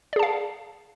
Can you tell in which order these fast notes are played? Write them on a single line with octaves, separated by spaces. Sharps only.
D5 G#4 A5 F5